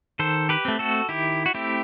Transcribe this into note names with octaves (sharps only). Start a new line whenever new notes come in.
D#3 A4 C5
G4 B4
A3 C4
F#4 A4
D#3 E4 G4
F#4
A3 C4 E4 G4